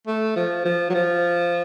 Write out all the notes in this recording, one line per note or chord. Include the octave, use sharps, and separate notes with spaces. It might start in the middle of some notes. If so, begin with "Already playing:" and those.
A3
F3
F3
F#3
F3